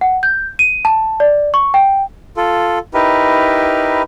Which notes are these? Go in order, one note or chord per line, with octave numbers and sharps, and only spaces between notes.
F#5
G6
D#7
A5
D5
C#6
G5
F4 A4
D#4 E4 G4 A#4 B4